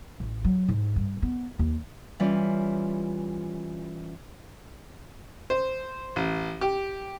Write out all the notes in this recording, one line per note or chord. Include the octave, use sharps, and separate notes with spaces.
A1
F#3
G#2
G2
B3
D#2
E3 G3 C#4 F4
C5
A1
G4